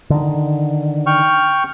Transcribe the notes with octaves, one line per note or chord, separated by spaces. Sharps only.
D3 D#3
G5 C#6 F6